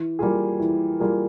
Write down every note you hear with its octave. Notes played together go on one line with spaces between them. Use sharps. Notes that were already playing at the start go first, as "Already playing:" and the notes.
Already playing: E3
G3 A#3 F4 G#4
E3
G3 A#3 F4 G#4